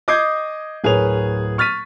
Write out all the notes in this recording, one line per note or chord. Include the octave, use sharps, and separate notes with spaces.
D#5 D6 D#6 G6 G#6 C7
D1 G#4 A#4 B4 C#5 F7
C#6 F6 A6 B6 D#7